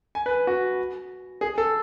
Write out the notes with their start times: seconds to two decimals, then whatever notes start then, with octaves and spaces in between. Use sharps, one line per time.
0.15 G#5
0.26 B4
0.47 F#4
1.41 G#4
1.58 A4